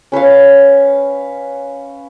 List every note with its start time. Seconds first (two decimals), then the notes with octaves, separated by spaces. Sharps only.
0.12 C#4 B4 C#5 F5